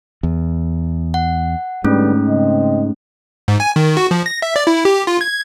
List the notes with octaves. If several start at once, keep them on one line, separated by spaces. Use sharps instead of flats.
E2
F#5
G#2 D3 G3 A3 B3 C#4
C#3 C4 D#5
G#2
G#5
D#3
F#4
F3
A#6
E5
D5
E4
G4
F4
G#6